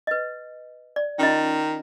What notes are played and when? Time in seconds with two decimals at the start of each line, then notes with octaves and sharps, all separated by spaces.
0.07 B4 D#5
0.96 D5
1.19 D#3 C#4 F4 D#5